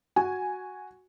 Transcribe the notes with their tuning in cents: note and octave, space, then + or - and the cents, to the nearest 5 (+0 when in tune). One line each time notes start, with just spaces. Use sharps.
F#4 +0 G#5 +0